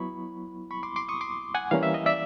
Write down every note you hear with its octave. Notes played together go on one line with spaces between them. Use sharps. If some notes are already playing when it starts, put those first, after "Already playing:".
Already playing: F#3 B3 E4 B5 C#6
B5 C#6
C6 D6
C6 D6
C#6 D#6
C6 D6
F#5 G#5
E3 G3 A#3 C#4 F5
E5
D#5
D5 E5